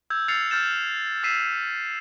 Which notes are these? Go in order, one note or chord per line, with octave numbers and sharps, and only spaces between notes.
E6 G6 G#6
E6 F6 A6 C7 C#7 F7
F6 G6 A6 E7
E6 B6 C7 D#7 E7